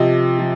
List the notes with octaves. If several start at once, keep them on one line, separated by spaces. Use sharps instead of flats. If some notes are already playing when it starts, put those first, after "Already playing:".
Already playing: C3 F3 D#5
F3